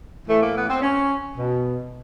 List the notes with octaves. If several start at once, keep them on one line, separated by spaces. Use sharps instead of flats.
A2 E3 A3
A#3
B3
C4
C#4
B2